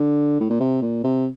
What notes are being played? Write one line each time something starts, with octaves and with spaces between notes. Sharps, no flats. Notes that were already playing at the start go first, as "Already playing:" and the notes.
Already playing: D3
A2
A#2
C3
A#2
C3